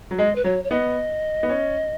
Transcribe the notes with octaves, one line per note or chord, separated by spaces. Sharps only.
F#3
G#3 D#5
B4
F#3 C#5
C#5
B3 D#5
B3
C#4